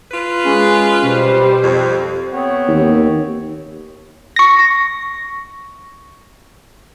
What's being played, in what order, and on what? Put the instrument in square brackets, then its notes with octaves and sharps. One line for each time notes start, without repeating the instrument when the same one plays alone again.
[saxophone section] F4 B4
[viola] G#3 [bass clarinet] C#4
[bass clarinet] B2 [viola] G3 C5
[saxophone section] F2
[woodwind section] B3 C4 C#5
[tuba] D#2
[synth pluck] C#6 A#6